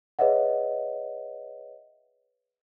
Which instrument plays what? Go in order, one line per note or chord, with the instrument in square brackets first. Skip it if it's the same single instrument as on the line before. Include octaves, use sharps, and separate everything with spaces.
[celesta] G#4 B4 C#5 D#5 E5 F#5